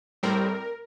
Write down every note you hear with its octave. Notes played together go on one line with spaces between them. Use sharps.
A2 G3 C4 A#4